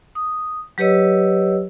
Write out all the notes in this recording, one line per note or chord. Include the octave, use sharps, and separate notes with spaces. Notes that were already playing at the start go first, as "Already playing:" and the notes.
D#6
F#3 G4 B4 C#5 D#5 E6